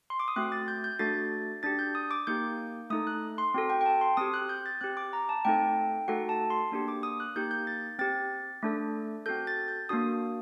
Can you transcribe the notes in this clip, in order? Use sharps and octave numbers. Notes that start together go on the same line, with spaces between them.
C6
D6
D#6
A3 C4 F#4 F#6
A6
G6
G6
A3 D4 F#4 A4 A6
D4 G4 A6
G6
D#6
D6
A#3 D#4 G4 G6
A3 D#4 A4 D#6
F#6
C6
C4 F#4 A4
G5
G5
A5
C6
C4 G4 D#6
F#6
G6
A6
C4 G4 F#6
D6
A#5
A5
A3 C4 D#4 A4 G5
A3 D#4 F#4 A4 F#5
A5
C6
A#3 D4 G4
D6
D#6
F#6
A#3 D#4 G4 G6
G6
A6
C4 G4 A6
A3 D4 A4
C4 F#4 A4 G6
A6
G6
A#3 D4 F#4 D#6